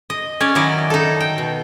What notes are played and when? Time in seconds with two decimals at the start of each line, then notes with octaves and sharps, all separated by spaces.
0.10 D#5
0.40 C#4 C#5 D5
0.55 D#3 F#3 E4 D5 D#5
0.90 D#4 A4
1.20 G5
1.38 B2